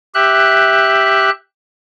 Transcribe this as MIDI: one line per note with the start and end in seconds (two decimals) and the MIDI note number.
0.15 1.30 67
0.15 1.30 76
0.15 1.30 90